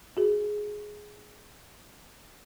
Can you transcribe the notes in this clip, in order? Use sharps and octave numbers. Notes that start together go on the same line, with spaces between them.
F#4 G#4